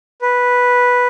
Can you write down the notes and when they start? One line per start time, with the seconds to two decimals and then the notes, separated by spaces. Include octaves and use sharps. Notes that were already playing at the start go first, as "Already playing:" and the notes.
0.22 B4